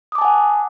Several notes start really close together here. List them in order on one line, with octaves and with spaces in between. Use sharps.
D#6 D6 A5 G#5 F#5